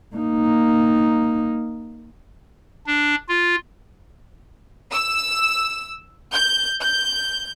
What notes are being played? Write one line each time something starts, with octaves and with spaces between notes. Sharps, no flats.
A#3 D#4
D4
F4
E6
G6
G6